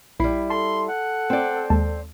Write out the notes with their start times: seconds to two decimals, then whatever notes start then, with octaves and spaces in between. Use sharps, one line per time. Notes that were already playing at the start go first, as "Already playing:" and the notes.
0.20 A#1 G3 E4 B5 C7
0.50 A4 A5 C6
0.89 F#5
1.30 C4 D5
1.70 D#2 G#3 A5